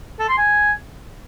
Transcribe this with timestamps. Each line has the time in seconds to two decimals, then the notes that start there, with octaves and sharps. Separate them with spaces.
0.19 A4
0.28 C6
0.38 G#5